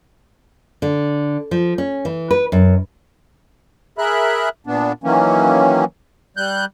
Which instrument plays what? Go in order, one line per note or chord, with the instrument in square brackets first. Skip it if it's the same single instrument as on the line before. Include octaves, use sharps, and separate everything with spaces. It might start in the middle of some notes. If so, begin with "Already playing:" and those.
[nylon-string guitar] D3
F3
C#4
E3
B4
F#2
[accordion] G#4 A#4 E5 B5 F#6
A#2 B3 D4
D#3 E3 F#3 A#3 C#4
G3 F#6 G6